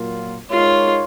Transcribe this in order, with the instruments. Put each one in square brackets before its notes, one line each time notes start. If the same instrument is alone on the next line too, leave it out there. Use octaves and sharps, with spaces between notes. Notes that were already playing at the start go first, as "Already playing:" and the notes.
Already playing: [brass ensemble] A#2 F#3 A#3 F4
[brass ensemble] G#3 D#4 A#4 C#5 [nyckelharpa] F4